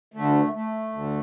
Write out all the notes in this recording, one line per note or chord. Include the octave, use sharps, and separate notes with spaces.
D2 D3 A3
A3
D2 D3